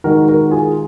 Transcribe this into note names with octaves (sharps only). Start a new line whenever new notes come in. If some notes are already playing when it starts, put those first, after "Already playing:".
D#3 G#3 F#4 A#4
F#4 A#4
F4 G#4